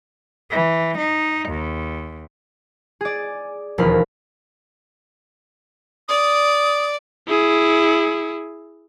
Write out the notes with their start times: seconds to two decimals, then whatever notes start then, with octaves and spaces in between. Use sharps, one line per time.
0.51 E3
0.98 D#4
1.49 D#2
3.01 G#4 D5
3.78 E1 D#2 F3 A#4 B5
6.08 D5 D#6
7.27 E4 G#4